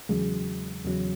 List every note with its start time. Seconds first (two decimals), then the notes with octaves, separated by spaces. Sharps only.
0.09 E2 C#3 F#3 G#3
0.85 E2 C#3 F#3